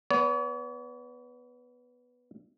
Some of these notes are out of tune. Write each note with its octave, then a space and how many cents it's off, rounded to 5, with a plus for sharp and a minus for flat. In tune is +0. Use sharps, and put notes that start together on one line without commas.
B3 +0 C#5 +45